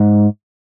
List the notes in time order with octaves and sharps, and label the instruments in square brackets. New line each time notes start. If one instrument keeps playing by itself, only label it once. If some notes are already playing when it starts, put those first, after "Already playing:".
Already playing: [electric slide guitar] G#2